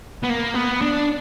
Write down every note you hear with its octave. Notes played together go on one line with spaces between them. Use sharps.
B3
A#3
B3
D4